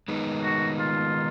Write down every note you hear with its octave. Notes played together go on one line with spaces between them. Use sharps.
D#3 G#3 B3 D#4
F#4
F4